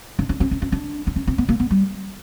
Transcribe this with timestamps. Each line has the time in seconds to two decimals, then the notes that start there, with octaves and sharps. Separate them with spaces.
0.19 D4
0.29 D4
0.40 C#4
0.51 C#4
0.62 C#4
0.72 D4
1.07 D4
1.16 C#4
1.27 C4
1.38 B3
1.49 A#3
1.60 B3
1.71 G3